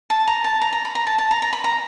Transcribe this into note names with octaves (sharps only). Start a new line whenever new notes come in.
A5
A#5
A5
A#5
A#5
B5
A#5
A5
A5
A#5
A#5
B5
A#5